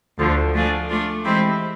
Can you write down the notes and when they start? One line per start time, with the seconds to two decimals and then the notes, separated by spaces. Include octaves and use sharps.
0.19 D2 D3 F3
0.54 F3 A3 D4 F4 G#4
0.89 A3 D4 F4
1.24 E3 G#3 C4 E4 G4